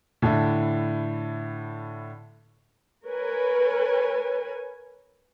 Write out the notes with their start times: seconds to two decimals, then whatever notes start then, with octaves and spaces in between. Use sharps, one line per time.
0.22 A2 D3 E4
3.07 A#4 B4 C#5 G#5